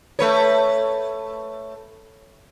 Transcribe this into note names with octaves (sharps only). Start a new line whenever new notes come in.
A3 B4 C#5